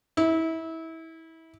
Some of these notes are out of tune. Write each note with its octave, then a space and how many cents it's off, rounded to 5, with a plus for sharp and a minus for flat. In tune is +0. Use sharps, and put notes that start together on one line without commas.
E4 -25